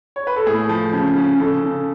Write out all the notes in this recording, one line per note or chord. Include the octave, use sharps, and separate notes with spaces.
C#5
B4
A4
A2 G#4
F3
C#3
C#3
C#3 A4
C#3